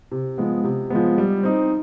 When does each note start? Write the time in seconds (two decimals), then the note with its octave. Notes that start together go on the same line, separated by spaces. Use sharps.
0.11 C3
0.38 F3 G#3 B3
0.64 C3
0.90 F3 G#3 B3
1.18 G3
1.43 C4 D#4